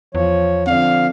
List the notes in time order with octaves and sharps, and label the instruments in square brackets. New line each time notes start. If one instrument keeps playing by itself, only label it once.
[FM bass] E2 [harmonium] F3 C#5
[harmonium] D3 F3 [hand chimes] C4 D5 [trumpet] F5